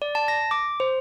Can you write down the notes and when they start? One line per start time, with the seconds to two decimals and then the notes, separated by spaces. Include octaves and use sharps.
0.02 D5
0.15 A5
0.28 A#6
0.51 D6
0.80 C5